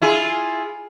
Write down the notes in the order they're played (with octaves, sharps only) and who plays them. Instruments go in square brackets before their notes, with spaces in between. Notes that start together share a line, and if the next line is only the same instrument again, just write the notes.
[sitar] E4 F4 G#4